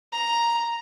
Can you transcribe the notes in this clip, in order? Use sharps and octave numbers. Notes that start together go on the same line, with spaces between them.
A#5